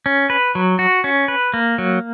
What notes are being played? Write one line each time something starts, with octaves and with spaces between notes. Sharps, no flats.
C#4
B4
F#3
F#4
C#4
B4
A#3
F#3